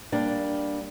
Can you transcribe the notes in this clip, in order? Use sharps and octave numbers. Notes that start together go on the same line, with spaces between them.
G3 A#3 D4